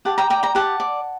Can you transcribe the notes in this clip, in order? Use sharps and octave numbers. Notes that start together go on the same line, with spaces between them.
G4 F#5 A5
G5 A#5
D5 G5 A#5
G5 A#5
G4 F#5 A5
D5